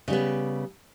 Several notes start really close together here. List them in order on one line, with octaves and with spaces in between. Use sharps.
C#3 G3 B3